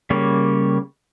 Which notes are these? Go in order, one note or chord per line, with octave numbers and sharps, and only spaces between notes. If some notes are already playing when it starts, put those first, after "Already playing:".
C#3 G3 A#3 C#5